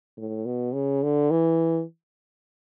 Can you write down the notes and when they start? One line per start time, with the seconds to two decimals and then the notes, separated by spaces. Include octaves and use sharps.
0.17 A2
0.46 B2
0.74 C#3
1.03 D3
1.31 E3